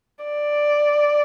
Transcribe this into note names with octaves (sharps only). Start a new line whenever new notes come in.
D5